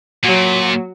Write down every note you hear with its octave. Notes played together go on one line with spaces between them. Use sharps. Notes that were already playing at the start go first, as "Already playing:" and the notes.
A#2 F#3